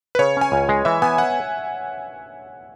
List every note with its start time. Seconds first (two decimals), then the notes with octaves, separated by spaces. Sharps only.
0.15 B4
0.19 C#3 C#5
0.37 C#4 G#5
0.52 C#2
0.69 G#3
0.85 E3 E5
1.02 B3 G#5
1.18 F#5